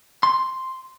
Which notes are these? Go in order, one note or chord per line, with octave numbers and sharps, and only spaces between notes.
C6